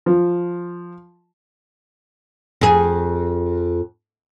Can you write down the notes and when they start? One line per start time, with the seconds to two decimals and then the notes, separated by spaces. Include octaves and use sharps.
0.06 F3
2.61 F2 G#4